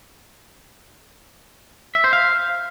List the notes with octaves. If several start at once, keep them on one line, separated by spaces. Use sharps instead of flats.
E5
C5
F5